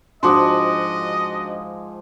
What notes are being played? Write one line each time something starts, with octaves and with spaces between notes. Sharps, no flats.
G#2 F3 D4 F#4 D#5 C6 D6 D#6